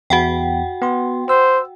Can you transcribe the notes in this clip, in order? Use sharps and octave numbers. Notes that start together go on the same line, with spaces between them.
E2 F#4 F#5 G5
B3 C6
C5 E6